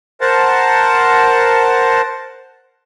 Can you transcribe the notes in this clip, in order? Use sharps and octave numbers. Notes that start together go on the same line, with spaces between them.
A#4 C5 F#5 A5